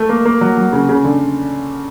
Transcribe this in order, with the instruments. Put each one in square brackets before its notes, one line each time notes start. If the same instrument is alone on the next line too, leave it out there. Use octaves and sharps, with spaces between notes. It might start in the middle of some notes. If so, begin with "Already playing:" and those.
Already playing: [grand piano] A3
A#3
A#3
F#3
F#3
C#3
C#3
D3